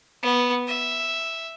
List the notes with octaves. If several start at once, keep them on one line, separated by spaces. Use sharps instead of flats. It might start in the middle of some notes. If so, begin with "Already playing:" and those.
B3
E5